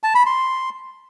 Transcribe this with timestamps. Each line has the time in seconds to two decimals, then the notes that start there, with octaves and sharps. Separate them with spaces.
0.03 A5
0.15 B5
0.26 C6